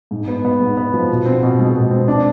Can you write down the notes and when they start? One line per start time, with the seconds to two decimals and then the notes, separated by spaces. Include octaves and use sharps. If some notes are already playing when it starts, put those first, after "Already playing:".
0.11 G#2
0.28 B3
0.45 B3
0.61 G#2
0.77 B3
0.94 F3
1.10 B2
1.26 C4
1.43 B2
1.59 G#3
1.75 B2
1.91 C4
2.08 D4